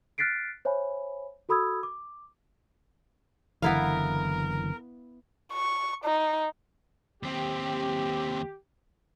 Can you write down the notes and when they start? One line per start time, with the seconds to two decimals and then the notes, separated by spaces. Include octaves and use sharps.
0.18 F6 F#6 A6 B6 C7 D7
0.65 C5 C#5 E5 G#5 B5
1.49 F#4 A4 B5 D#6 E6 G#6
1.83 D6
3.62 F#1 D3 E3 B3 E4 A#4 F5
5.53 C#6
6.05 D#4
7.23 D#2 C4 G4